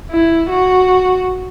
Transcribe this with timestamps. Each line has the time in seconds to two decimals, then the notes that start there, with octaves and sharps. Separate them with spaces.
0.11 E4
0.49 F#4